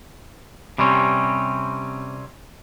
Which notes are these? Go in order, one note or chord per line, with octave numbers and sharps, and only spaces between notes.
C3 G3 C4 C#4